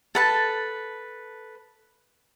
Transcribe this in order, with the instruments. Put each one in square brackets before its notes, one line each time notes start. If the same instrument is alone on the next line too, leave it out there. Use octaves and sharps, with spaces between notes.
[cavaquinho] A4 B4 A5